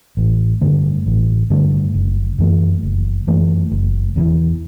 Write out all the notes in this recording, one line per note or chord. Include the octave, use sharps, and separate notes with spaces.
A1
G2 D3 A3
A1
G2 D3 A3
F#1
F#2 E3 A3
F#1
F#2 E3 A3
F#1
E2 C3 E3